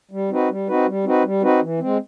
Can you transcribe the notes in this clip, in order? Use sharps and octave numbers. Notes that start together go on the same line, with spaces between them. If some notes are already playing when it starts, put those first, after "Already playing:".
G3
C4 D#4 F#4 B4
G3
C4 D#4 F#4 B4
G3
C4 D#4 F#4 B4
G3
C4 D#4 F#4 B4
E3
G#3 C4